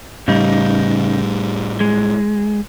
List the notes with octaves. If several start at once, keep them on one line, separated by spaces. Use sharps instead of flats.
A2 C#3 G3 D#4
G#3